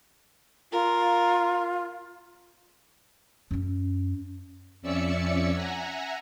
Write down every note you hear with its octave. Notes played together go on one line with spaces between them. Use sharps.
F4 A#4
F#2 C#4
F2 C#4 D5 E5 E6 C#7
E5 F#5 G#5 A#5